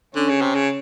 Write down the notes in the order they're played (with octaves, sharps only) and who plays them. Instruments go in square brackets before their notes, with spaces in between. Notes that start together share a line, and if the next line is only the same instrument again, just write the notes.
[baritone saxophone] D3 [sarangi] C#4
[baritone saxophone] C#3
C3
C#3